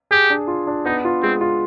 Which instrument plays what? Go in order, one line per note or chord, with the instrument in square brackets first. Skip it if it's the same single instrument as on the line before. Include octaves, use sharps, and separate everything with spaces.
[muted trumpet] G4 [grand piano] G#4
[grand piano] D4
F4
D4
[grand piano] B3 [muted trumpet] D#4
[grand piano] F4
[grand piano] G#3 [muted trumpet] C4
[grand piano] F4